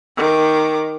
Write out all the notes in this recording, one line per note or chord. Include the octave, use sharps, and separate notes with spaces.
D#3 D6